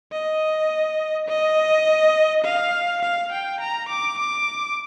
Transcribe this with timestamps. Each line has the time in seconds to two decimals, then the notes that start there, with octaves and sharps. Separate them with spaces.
0.12 D#5
1.29 D#5
2.44 F5
3.02 F5
3.32 G5
3.61 A#5
3.89 D6
4.18 D6